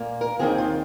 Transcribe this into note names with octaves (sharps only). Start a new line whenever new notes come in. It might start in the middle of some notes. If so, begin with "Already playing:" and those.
Already playing: A#2 A#3
A#4
D#2 D#3 C4 G#4
F4